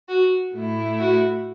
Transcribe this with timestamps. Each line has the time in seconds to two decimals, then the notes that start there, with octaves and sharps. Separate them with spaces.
0.09 F#4
0.54 A2 A3 E4
0.99 F#4